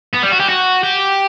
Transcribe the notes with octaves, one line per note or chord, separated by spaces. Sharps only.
B3
G3
F#4
G4
F#4
G4